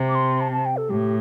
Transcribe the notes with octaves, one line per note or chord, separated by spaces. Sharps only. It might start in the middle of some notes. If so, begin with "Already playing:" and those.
Already playing: C3
D6
C6
A5
A5
G5
A4
A2 G4